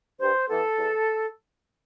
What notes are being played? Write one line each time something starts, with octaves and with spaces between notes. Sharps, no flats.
G2 C5
E3 B3 A4
E2